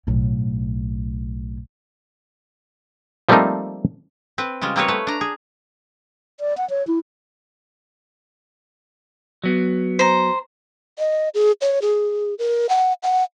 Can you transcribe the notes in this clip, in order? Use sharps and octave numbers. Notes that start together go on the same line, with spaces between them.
B1 A2
F3 G3 A3 A#3 C4 D#4
C4 B4
C#3 G3 G#3 F4
G3 A#3 C4 G#4 B4 C#5
A3 B4
D4 A#5
G#4
D5
F#5
C#5
E4
F#3 B3
C5 A#5
D#5
G#4
C#5
G#4
A#4
F#5
F#5